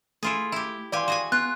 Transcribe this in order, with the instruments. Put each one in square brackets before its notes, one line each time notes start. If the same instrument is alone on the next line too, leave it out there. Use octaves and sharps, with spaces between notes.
[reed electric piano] A3 [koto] E4 F4 G#4
[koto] E4 G4
[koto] E3 G4 G#5 [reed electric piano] D5 F5 C6
[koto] F#4 G#4 G#5
[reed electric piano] B3 [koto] F4 [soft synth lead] F#6